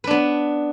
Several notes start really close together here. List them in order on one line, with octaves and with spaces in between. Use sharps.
B4 D4 B3